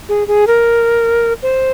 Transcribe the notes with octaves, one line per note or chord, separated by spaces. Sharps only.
G#4
G#4
A#4
C5